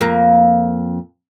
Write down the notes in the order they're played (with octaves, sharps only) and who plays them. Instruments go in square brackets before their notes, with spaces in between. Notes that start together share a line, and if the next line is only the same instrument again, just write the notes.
[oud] F2 A#3